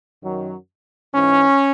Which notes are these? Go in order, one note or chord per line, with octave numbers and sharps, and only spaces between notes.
F#2 D#3 F#3
G#2 E3 C#4